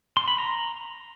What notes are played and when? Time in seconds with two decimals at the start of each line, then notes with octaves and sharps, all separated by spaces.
0.17 C6
0.28 B5
0.38 A#5